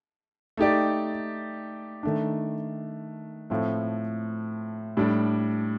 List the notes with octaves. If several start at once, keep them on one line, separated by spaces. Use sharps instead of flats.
A3 D#4 G4 D5
D#3 A3 D4
A2 F3 A3 C4
A2 G3 D4